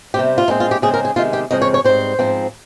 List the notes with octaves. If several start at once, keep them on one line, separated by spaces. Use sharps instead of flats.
C3 G3 C4 G4
F4
A#2 G#3 C4 D#4
F4
G4
C#3 G#3 C4 G#4
A#4
G#4
C3 D#3 G#3 F4
G4
F2 C#3 G#3 C4 D#5
C#5
C#5
G#2 G3 C4 C5
G#2 F3 C4